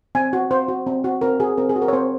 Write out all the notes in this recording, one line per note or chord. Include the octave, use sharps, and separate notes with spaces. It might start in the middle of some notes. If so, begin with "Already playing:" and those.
C4 G#5
F#4
C4 C5
F#4
C4
F#4
C4 A#4
F#4 G#4
C4 A#4
G#4
F#4
A#4
C#5
C4 C5